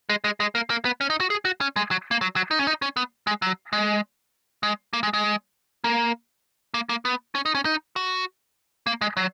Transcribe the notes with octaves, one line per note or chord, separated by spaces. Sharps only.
G#3
G#3
G#3
A#3
A#3
B3
C#4
D#4
F#4
G#4
F#4
C#4
G#3
F#3
A#3
F#3
F#3
D#4
C#4
D#4
C#4
B3
G#3
F#3
G#3
G#3
A#3
G#3
G#3
A#3
A#3
A#3
B3
C#4
D#4
C#4
D#4
F#4
A#3
G#3
F#3